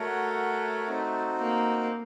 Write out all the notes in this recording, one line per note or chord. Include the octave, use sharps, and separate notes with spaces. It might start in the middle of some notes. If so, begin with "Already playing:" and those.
Already playing: A3 F#4 A#4 C#5 F#5
C4 D#4 F#4
A#3